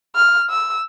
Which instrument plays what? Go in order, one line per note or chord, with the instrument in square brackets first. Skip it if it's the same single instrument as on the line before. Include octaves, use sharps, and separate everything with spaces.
[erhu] F6
E6